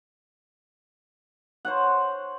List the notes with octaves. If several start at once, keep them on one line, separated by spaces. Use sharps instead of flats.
C5 C#5 F#5